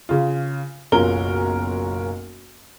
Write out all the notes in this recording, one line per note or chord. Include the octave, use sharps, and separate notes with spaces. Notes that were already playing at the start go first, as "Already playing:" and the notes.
C#3 F4
F#1 B1 C#4 F4 A#4 G7